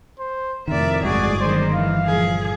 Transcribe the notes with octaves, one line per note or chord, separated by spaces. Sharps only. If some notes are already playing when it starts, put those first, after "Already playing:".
C5
F2 A2 C3 D#3 A#4 D5 E5
G1 G#3 F#4 G#4 D5
F#2 D#3 A#3 C5
E3 F5
A#2 F3 G#4